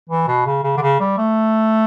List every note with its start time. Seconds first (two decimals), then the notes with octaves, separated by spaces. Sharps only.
0.09 E3
0.28 B2
0.46 C#3
0.64 C#3
0.77 D3
0.81 C#3
1.00 G3
1.18 A3